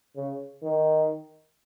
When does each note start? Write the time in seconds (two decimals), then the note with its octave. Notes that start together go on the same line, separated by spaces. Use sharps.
0.16 C#3
0.63 D#3